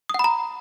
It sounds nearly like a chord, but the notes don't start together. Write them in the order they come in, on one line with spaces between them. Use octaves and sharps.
D#6 F#5 B5 A#5